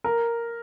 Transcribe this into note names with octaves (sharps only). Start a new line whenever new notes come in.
A#4